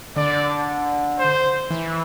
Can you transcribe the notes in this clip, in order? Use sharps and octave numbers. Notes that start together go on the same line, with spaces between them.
D3 D5
C5
E3